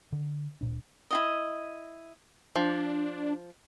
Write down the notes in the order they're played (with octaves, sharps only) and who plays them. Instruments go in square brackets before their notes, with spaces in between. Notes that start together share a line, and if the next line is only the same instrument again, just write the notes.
[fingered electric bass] D3
D1 A#2 D4
[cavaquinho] E4 F4 D#5
[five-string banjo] F3 [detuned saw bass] D4